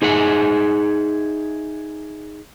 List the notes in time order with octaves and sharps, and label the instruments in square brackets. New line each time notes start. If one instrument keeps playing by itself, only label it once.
[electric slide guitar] D#4 G#4 E5 F#5